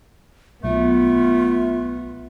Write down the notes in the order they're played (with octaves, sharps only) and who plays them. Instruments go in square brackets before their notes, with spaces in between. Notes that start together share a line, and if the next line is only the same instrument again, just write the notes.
[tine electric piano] B1 [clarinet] A3 [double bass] B3 [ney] F4